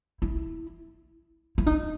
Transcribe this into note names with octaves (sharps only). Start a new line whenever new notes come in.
E4
E4
D#4